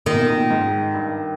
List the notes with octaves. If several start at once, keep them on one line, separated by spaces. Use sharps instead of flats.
A#2 D#3
B2
A#2
B2
A#2
G#2
G2